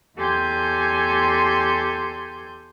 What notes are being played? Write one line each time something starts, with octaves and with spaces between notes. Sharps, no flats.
E2 G4 A4 G#5 C6 G6